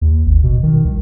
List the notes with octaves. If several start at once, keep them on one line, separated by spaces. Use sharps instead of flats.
D#2
G#1
B2
D#3
C2